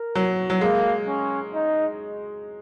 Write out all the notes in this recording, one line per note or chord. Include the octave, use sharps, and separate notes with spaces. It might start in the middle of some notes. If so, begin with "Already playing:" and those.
Already playing: A#4
F#3
F#3
G#3 A#3
C#4
D#4